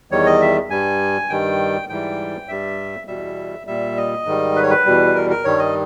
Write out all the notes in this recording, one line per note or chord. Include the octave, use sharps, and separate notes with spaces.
E2 D#3 G3 C#5
D#5
E5
G2 G3 G#5
G2 D#3 G3 G5
G#2 E3 G3 G5
G2 G3 E5
E2 B2 G3 E5
A#2 G3 E5
D#5
G#2 D#3 G3
B4
C#5
B4
E2 B2 G3
A#4
A#4
G2 D#3 G3 C#5
D#5